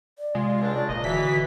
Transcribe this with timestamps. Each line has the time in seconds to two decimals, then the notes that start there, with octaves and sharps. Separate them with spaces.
0.19 D5
0.35 C3 G#3 F4
0.61 C#2 D4
0.89 F1 A#2 D#5
1.04 D3 E3 F#4 B6